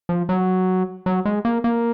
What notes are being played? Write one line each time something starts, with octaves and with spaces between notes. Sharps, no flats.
F3
F#3
F#3
G#3
A#3
A#3